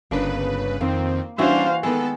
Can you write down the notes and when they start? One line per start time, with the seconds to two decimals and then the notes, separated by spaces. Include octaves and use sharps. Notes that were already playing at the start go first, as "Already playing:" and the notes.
0.11 G1 C#3 A#3 D4 B4
0.81 F2 D#3 A#3 C4
1.38 E3 G3 C#4 D4 F#4 C5 E5 F5
1.83 D#3 G#3 B3 A4